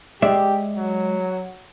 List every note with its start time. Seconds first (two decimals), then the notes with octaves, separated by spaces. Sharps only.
0.22 G#3 G4 D5 E5
0.76 F#3